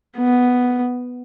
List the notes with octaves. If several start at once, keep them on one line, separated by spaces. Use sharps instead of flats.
B3